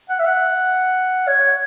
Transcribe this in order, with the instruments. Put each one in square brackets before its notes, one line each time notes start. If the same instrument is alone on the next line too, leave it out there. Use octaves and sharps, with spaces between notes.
[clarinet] F#5
E5
F#5
C#5